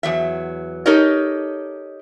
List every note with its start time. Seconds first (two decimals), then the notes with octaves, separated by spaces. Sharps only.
0.03 E2 F#3 E5
0.86 D#4 G4 A4 A#4 C#5 D#5